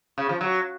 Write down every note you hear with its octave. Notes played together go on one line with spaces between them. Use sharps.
C#3
F3
F#3